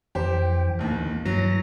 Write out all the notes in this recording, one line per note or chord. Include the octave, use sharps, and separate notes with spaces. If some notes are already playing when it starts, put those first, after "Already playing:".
F2 E3 G4 C5 G5
A#1 D#2 D#3 E3 A#3
G2 E3 F#3 A#6